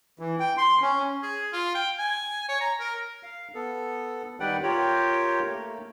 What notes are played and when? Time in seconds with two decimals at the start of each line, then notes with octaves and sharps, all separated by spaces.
0.19 E3
0.40 G5
0.57 C6
0.82 C#4
1.23 G#4
1.53 F4
1.75 G5
1.99 G#5
2.49 C#5
2.61 A#5
2.80 A#4
3.23 F5
3.55 B3 A4
4.40 D#3 G3 B4 D5 F#5 G5
4.63 F4 G4 A#4 C#5 G5
5.45 A3 A#3